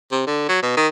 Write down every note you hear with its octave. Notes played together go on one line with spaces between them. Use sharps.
C3
D3
F#3
B2
D#3